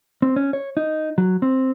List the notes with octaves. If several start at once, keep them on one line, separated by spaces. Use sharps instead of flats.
C4
C#4
C#5
D#4
F#3
C4